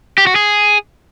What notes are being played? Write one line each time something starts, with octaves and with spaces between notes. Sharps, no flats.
G4
F#4
G#4